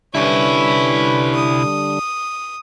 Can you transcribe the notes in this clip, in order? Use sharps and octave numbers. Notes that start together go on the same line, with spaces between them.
C2 D3 G3 C#4 D4 E4 B4
D#6